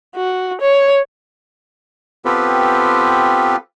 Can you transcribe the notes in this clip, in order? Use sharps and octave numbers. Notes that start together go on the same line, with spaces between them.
F#4
C#5
B3 C4 F4 G4 A4 B4